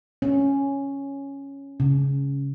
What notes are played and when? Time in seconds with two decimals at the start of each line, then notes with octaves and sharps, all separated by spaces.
0.22 C#4
1.80 C#3